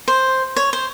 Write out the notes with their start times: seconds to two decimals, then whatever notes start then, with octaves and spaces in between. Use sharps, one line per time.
0.08 C5
0.56 C#5
0.73 C5